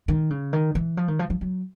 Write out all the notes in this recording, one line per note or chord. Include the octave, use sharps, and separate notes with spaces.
D#3
C#3
D#3
E3
F3
D#3
F3
F3
F#3